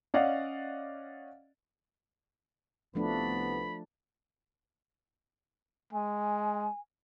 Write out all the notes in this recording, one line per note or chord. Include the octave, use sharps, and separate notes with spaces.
C#4 D5 D#5 F5 F#5
C2 F3 A3 B3 D4 B5
G#3 G#5